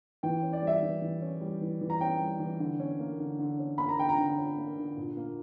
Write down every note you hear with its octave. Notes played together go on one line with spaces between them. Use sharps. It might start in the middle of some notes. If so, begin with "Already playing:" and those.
E3 G5
C#4
D5
G3 E5
E3
E3
C#4
G3
E3
E3
A#5
C#4 G5
G3
E3
D3
C#4
A#3
D3
D3
C#4
A#3 B5
A#5
D3 G5
A#5
D3
C#4
A#3
D3
A#2
A#3